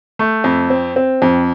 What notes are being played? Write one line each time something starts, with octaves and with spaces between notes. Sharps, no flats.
A3
F2
C4
C4
F2